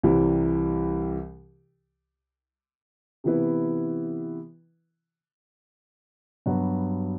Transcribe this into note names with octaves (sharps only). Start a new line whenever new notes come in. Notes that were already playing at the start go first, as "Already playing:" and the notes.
C2 C3 E3 G3
C3 E3 B3 E4 B4
G2 F#3 B3 F#4